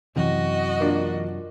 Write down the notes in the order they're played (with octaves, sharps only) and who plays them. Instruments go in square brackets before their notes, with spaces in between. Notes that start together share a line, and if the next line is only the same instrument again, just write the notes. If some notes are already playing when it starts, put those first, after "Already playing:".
[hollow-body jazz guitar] F#2 C3 [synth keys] E3 E4 [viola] F#4 D#5
[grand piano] A#3 D4 F4